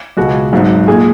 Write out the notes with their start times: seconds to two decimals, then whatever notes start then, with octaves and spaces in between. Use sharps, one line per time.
0.17 C#2 B2 G#3 F#4
0.52 G#1 G#2 F#3
0.88 A#2 G#3 G#4